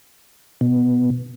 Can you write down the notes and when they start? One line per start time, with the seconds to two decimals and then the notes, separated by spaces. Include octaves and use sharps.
0.61 B2